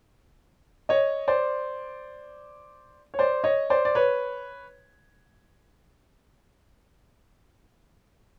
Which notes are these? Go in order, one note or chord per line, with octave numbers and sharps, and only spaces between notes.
C#5 D#5
C5 D5
C#5
C5 D5
C#5 D#5
C5 D5
D5
B4 C#5